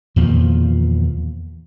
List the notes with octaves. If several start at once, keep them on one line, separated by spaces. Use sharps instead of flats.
E2 A#2 D#3 F3